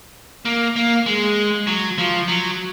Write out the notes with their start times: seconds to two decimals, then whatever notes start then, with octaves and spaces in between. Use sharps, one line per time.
0.45 A#3
0.76 A#3
1.06 G#3
1.67 F#3
1.98 F3
2.28 F#3